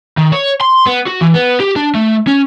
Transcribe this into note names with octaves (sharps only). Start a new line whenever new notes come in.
D#3
C#5
C6
B3
F#4
E3
B3
G4
D4
A3
C#4